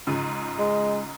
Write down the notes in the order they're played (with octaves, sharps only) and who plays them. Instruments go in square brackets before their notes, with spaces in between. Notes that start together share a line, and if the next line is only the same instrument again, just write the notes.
[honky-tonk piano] G#2 C#3 F3
[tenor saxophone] G#3